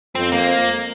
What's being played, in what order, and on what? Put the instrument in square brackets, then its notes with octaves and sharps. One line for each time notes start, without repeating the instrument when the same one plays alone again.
[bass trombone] F2 [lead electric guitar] C4
[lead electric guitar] A#3